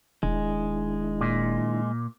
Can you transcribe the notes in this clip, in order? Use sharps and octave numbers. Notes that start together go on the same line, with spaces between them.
D#1 D#3 G#3 D4 E4
A#2